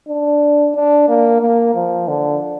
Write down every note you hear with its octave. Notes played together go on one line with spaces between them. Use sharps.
D4
D4
A#3
A#3
F3
D3